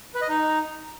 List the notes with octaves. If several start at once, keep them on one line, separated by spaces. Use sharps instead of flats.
B4
D#5
D#4